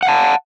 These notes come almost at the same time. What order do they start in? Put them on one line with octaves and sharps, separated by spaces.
F#5 F5 A5